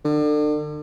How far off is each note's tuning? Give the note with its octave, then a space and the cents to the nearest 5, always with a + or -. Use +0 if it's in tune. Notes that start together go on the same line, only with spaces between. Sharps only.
D3 +35